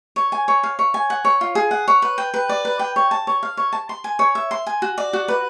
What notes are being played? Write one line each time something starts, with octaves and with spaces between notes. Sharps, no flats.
C#5
G#5
C#5
F5
C#5
G#5
F#5
C#5
F4
G#4
F#5
C#5
B4
G5
B4
D5
B4
G5
C#5
A5
C#5
F5
C#5
A5
C6
G#5
C#5
E5
C6
G#5
F#4
D5
F#4
B4